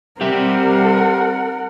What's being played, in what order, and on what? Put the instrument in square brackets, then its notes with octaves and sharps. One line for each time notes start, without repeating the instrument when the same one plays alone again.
[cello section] G3 C4 [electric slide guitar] G4 E5 G5 [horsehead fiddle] A#4 F#5